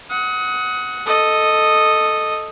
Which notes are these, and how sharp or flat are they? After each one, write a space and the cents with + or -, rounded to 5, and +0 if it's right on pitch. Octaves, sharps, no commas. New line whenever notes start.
F#5 +0 D#6 +30
A4 +0 D#5 -5